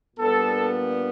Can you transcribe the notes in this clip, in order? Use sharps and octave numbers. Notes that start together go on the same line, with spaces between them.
A#2 G3 B3 D4 A4